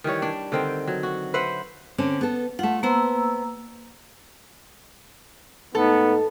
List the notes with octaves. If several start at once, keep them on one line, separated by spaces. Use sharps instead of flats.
D#3 E3 G3 C#5
D4
D3 D#3 C4 G5
F#3
F#4
B4 C5 E5 F#5
D3 C4 C#4
B3 A4
A3 F4 F#5
A#3 B3 C5 A#5 E6
G#2 A3 B3 D#4 A4